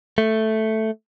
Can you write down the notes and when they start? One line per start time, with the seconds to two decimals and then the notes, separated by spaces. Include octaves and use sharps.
0.18 A3